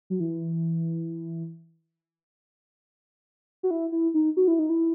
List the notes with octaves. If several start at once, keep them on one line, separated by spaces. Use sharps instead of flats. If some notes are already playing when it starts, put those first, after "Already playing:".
F#3
E3
F#4
E4
E4
D#4
F#4
E4
D#4
E4